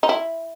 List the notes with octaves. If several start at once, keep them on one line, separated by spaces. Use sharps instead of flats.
D#4
E4